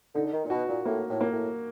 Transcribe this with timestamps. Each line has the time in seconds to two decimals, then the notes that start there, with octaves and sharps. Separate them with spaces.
0.15 D3 D#4
0.26 D3
0.34 D#3
0.45 A#2
0.50 B2 F#4
0.69 A#2
0.85 A2 A#3
1.09 A2
1.21 A#3
1.33 A2